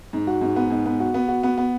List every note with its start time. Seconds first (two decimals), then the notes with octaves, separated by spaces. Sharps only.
0.13 G#2
0.27 F#4
0.41 G#2
0.56 B3
0.70 G#2
0.86 B3
1.00 F#4
1.14 B3
1.28 F#4
1.43 B3
1.57 B3